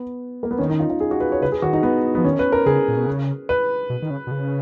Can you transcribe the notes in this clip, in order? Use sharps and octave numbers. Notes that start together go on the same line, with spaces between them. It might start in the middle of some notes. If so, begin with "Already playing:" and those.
Already playing: B3
A#3
B3
D#3 C#4
D#4
F4
F4
G#4
F#4
B4
C#5
C#3 B4
G#4
D#3 F#4
D#4
B3
F3 B3
D#3 C#4
B4
A#4
C#3 G#4
A#2
B2
C#3
B4
B2
D#3
C#3
B2
C#3